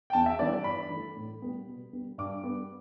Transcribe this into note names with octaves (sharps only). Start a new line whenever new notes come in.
G5
E2 A5
E5
E3 G3 B3 D5
D5
G2 B5
E3 A3
A2
G3 B3
B2
G3 B3
G2 D6
G3 B3